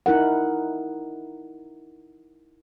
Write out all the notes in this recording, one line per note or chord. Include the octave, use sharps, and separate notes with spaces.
D#4 E4 A#4 F#5